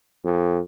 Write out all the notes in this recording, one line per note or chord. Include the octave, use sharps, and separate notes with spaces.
F2